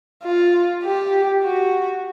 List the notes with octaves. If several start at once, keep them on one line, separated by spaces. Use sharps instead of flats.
F4
G4
F#4